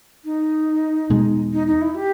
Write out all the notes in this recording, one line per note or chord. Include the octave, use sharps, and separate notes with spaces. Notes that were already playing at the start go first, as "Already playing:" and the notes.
D#4
E2 B2 G#3
D#4
D#4
E4
G4